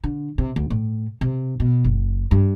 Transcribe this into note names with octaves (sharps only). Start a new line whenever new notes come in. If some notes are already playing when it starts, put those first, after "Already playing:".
D3
C3
D2
A2
C3
B2
F#1
G2